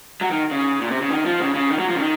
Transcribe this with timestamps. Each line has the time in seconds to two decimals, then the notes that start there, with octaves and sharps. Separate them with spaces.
0.21 F#3
0.31 D#3
0.51 C#3
0.81 A#2
0.91 C3
1.01 C#3
1.10 D#3
1.26 F3
1.40 C#3
1.55 C#3
1.70 D#3
1.79 F#3
1.89 F3
1.95 C#3
1.99 D#3